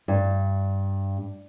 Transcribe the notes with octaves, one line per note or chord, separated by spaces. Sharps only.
G2